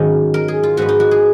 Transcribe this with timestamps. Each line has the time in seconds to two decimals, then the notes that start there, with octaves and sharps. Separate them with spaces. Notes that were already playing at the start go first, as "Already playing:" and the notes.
Already playing: G#2 D#3 F#3 C#4
0.34 A#4
0.48 G#4
0.63 F4
0.77 G#2 F3 G#3 B3 F#4
0.89 D#4
1.00 F#4
1.11 G#4